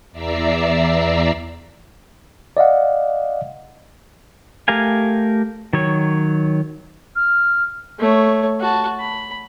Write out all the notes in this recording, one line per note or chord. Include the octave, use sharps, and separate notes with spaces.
E2 D5 E5 A#5 E6 C7
D5 D#5 F5 F#5
A3 G4 A#4 F5 G#5
D#3 F#3 C#5
F6
A3 C#5
F#4 A5
B5